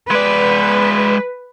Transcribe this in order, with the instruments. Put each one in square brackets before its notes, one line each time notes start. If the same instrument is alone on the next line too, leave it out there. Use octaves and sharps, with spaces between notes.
[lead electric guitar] G#3 D5 [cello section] B4